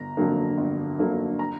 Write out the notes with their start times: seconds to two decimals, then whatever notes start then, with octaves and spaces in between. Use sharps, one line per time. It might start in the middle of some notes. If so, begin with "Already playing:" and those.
Already playing: G1 A#5
0.17 F2 D3 F#3 A#3
0.58 G1
0.98 F2 D3 F#3 A#3
1.39 A#5